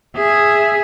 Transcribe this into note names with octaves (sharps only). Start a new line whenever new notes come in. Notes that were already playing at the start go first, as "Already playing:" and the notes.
G#4 E5